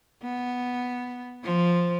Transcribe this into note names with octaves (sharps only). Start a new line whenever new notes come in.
B3
F3